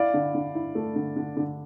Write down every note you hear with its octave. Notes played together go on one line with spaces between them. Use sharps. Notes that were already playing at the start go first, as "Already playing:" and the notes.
Already playing: E4 D5 F5
D3
D3
E4
A3
D3
D3
D3